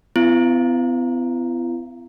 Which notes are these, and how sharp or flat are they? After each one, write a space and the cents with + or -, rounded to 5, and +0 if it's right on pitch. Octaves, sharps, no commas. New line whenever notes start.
B3 +45 E4 +45